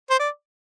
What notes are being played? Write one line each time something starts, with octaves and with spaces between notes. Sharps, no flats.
C5
D5